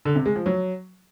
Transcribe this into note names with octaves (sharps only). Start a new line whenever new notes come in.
D3
C3
G#3
F3
F#3